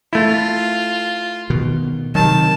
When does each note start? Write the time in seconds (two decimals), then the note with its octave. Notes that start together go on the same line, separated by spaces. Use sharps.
0.13 A3 E4 F4
1.50 B2 D#3
2.15 C3 D#3 F#3 A5